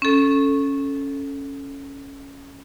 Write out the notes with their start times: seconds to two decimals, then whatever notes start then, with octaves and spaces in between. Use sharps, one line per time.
0.02 C#4 A4